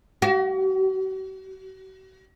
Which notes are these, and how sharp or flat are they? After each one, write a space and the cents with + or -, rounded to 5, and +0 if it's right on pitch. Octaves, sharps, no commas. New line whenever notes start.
F#4 +45